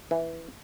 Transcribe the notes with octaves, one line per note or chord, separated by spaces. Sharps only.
E3